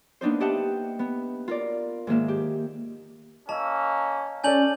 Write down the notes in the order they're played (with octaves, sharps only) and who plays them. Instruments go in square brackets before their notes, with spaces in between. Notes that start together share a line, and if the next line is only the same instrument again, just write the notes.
[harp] A#3 B3 D4 D#4 C5
G4 D#5 E5 F#5 G5 A5
B3
F4 A#4 D5
G#2 D#3 A#3 E5
G4
[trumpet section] A#3 C#4 [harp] D#5 E6 [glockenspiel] A5
[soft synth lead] C#4 [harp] A4 D5 A5 [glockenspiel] G#5 G6 F#7